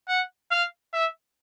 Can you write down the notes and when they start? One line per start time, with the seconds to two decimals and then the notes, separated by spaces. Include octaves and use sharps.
0.08 F#5
0.51 F5
0.93 E5